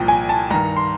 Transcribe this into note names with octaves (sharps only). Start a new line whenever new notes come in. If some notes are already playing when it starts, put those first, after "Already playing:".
Already playing: C2 A#2 F3 G5
G#5
A5
G2 D#3 A#5
C6